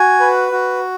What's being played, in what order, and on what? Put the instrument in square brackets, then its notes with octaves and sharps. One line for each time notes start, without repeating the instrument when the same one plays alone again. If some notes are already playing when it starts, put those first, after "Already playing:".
Already playing: [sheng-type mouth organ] F#4 G#5
B4
F#4